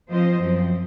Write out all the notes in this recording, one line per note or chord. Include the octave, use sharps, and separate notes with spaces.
F3 C4 F4 C5 D#5
F#2 F3 C4